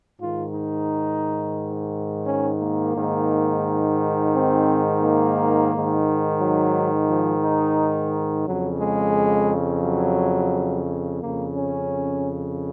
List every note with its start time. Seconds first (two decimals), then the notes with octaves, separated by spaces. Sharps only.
0.20 G#2 D#3 F4
0.55 D#4
2.27 C#4
2.62 A#3
2.95 G#2 D#3
4.34 C4
5.02 A#3
5.71 G#2 D#3
6.40 F#3
7.09 F3
7.43 D#4
8.47 F2 C#3 F#3
8.81 G#3
9.84 F#3
11.22 F2 C#3 A#3
11.56 C#4